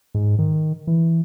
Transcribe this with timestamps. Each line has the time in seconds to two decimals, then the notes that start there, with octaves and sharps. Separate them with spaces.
0.15 G#2
0.39 D#3
0.87 E3